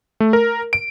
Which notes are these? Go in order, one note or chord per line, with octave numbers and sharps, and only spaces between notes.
A3
A#4
D7